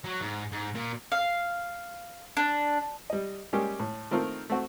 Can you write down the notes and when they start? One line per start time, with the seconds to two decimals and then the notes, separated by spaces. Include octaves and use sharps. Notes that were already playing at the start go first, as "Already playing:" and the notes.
0.04 F#3
0.21 G#2
0.52 G#2
0.75 A#2
1.12 F5
2.37 D4
3.10 G3 D#5
3.53 G3 G#3 A#3 C#4 G4
3.80 A2
4.11 D#3 A3 A#3 C4 F4 A#4
4.50 A3 C4 F#4